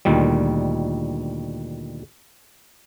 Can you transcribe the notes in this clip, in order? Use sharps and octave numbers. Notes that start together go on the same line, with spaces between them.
D2 A#2 D#3 G3